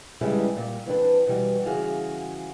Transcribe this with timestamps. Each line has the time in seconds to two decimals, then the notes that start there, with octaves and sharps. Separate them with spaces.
0.21 C#3 E3 G3 G#3 D4 E4
0.57 A#2 G3
0.86 E3 C4 D4 B4
1.26 B2 E3 G3 F#4
1.66 C#3 E3 F#4 G#4 F5